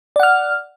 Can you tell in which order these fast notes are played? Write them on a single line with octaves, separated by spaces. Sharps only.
D5 F#5 F6